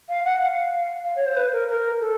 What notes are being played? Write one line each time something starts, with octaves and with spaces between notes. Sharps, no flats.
F5
F#5
F5
F5
C#5
C5
B4
A#4
A#4
A4